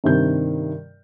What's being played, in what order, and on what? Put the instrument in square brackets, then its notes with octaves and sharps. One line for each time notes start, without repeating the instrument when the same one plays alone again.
[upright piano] G2 C3 D#3 A#4 G6